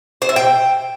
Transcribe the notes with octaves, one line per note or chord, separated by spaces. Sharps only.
C5
E5
G5